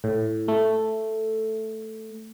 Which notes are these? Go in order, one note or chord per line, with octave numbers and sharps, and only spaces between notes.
A2
A3